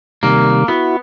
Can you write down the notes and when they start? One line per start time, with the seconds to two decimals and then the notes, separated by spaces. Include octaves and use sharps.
0.23 C3 D#3 G3 A#3
0.68 B3 E4 F#4